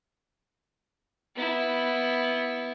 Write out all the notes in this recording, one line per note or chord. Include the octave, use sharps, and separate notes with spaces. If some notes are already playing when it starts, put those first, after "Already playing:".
B3 E4